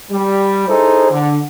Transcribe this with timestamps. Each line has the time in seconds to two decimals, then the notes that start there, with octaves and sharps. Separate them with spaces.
0.11 G3
0.68 D#4 E4 G#4 A4 C5
1.11 D3